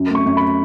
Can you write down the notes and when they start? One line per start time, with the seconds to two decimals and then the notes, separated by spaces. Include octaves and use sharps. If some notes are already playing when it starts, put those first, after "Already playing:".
Already playing: F#2
0.10 A3 C#6
0.26 F#2
0.37 B5